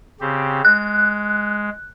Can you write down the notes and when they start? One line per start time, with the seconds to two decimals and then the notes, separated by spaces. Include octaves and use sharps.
0.21 C#3 C4 G4
0.65 G#3 F#6